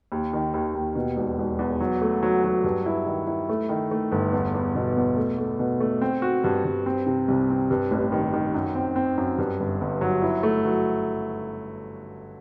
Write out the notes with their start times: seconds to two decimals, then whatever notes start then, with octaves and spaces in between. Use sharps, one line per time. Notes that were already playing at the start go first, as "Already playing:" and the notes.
0.12 D#2
0.33 D#3
0.54 D#2
0.75 D#2
0.96 B2
1.16 E1
1.38 E1
1.59 E2
1.80 F#3
2.01 A3
2.23 F#3
2.44 F#3
2.64 G2
2.86 E4
3.06 D#3
3.27 E4
3.49 A3
3.69 D#3
3.91 A3
4.12 G1
4.33 E2
4.54 E2
4.75 B2
4.97 E2
5.17 A3
5.38 A3
5.59 B2
5.80 A3
6.02 C4
6.22 F#4
6.44 G2
6.65 G2
6.86 C4
7.06 C3
7.28 C2
7.50 C4
7.71 G2
7.91 A1
8.12 D#3
8.34 D#3
8.54 F#2
8.75 C4
8.96 C4
9.18 F#2
9.38 G2
9.60 G1
9.81 G1
10.01 F#3
10.22 E4
10.43 A3
10.65 F#3